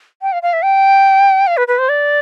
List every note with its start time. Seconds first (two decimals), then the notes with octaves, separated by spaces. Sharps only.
0.22 G5
0.32 F5
0.43 F5
0.53 E5
0.64 G5
1.47 F5
1.57 B4
1.68 B4
1.78 C5
1.89 D5